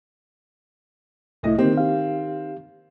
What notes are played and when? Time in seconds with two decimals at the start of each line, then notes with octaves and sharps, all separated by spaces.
1.43 C2 A2 A3 E4 D#5
1.58 D#3 A#3 C4 G4
1.77 G4 F5